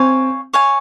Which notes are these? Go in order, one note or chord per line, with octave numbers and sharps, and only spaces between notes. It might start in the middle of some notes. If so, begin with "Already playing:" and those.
Already playing: C4 C#5 F5 G#5
C#5 F5 G#5